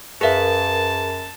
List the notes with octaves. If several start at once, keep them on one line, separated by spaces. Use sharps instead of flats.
F#2 G#4 A#4 B4 E5 F5 A5